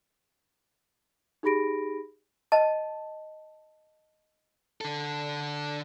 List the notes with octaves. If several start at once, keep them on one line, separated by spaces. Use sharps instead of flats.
D#4 G4 G#4 B5 A#6 D7
D#5 A5
D3 A4